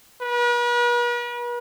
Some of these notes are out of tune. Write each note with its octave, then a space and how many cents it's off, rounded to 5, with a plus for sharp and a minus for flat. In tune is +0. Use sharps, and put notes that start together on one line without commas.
B4 -45